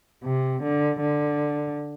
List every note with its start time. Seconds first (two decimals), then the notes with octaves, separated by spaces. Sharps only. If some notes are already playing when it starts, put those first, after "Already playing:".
0.24 C3
0.63 D3
1.00 D3